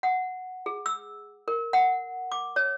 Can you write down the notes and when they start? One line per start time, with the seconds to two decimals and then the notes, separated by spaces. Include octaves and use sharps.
0.03 F#5
0.66 G#4
0.86 E6
1.48 A#4
1.73 F#5
2.32 D6
2.56 C#5